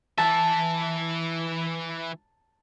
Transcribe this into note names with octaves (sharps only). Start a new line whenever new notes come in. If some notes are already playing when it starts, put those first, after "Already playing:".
E3 E5 A5